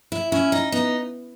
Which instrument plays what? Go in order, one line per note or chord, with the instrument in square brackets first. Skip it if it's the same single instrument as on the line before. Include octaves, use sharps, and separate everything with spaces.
[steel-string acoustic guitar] E4
[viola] C#4 [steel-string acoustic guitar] E4
[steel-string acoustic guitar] D#4
[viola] B3 [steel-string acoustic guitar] D#4